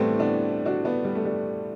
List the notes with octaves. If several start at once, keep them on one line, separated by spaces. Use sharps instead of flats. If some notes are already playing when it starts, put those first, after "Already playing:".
Already playing: A2 E3 G3 A3 B3 C4
B3 D4
D4 F#4
B3 D4
G3
A3
G3